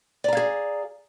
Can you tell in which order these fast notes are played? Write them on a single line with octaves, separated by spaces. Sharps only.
D5 A#5 F5 G#4